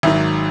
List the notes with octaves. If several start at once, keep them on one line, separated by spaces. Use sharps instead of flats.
G#1 G#2 D#3 F#3 E5